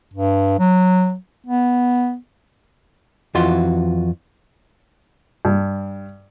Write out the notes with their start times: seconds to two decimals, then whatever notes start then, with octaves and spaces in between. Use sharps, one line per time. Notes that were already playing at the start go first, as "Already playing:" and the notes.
0.13 G2
0.59 F#3
1.46 B3
3.35 F2 E3 F4 F#4 C6
5.45 G2